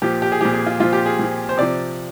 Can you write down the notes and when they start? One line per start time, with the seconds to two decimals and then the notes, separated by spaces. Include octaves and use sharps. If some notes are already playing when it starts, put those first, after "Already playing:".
0.02 A#2 F3 G4
0.22 G4
0.32 G#4
0.41 A#2 F3 G4
0.53 G#4
0.66 F4
0.80 A#2 F3 F4
0.93 G4
1.06 G#4
1.19 A#2 F3
1.49 C5
1.58 C3 F3 D5